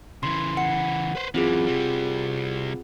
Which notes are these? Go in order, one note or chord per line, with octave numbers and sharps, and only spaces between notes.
C#3 E3 C6
F#5 C#7
B4 C5
F#2 E3 C4 F4 G#4
C3 G3